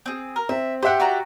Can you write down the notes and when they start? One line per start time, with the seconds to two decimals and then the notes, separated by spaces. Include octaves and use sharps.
0.06 C4 G#4
0.36 A#4
0.49 C4 E5
0.83 G4 C5 E5 F#5 G5
1.00 F#4 D5 A#5